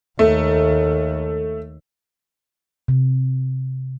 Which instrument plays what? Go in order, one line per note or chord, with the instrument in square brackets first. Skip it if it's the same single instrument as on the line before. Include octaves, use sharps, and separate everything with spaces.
[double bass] D#2 [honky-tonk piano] A3
[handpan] C3